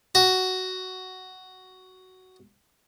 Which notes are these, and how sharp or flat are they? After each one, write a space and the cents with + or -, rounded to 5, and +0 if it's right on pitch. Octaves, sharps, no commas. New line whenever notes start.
F#4 +10